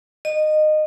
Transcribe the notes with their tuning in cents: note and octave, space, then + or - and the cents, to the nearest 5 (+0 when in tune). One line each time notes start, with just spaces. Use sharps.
D#5 -20